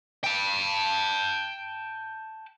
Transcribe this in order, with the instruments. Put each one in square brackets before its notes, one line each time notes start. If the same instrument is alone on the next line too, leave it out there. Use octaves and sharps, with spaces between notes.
[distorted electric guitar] G5 A5